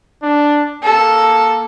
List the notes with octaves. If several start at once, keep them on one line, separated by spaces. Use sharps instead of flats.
D4
A#3 A4